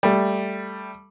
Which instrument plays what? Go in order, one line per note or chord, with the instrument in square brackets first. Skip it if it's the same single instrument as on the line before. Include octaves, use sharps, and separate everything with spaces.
[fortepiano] G3 A3